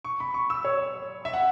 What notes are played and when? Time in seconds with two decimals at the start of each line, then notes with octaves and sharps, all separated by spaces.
0.04 C#6
0.20 B5
0.34 C#6
0.50 E6
0.65 C#5
1.25 E5
1.34 F#5